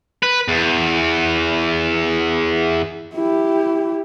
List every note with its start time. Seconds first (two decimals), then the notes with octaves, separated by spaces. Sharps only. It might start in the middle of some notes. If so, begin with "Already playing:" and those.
0.23 B4
0.48 E2
3.14 E4 G4